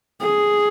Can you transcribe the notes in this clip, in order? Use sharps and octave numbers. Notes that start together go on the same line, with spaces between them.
G#4